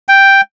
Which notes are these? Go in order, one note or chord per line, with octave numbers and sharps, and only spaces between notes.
G5